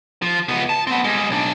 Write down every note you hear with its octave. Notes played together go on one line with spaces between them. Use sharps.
F3
C#2 B3
A5
B3 C4
G3 G#3
B1 D4